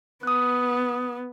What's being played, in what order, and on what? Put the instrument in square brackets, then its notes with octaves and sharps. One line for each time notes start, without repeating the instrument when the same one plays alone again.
[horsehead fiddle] B3 [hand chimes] D#6 F#6